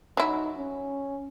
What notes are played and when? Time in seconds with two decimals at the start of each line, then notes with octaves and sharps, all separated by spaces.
0.17 F#3 D#4 E4
0.57 C#4